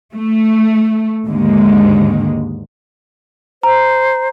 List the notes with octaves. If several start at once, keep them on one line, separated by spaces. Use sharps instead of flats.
A3
D#2 G#2 D3 G#3
C5 A#5